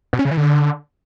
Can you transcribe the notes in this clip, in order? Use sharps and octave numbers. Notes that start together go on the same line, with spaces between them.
B2
C#4
C#3
E3
D3